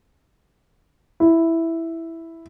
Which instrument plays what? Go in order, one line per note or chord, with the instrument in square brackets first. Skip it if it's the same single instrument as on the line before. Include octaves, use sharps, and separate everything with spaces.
[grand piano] E4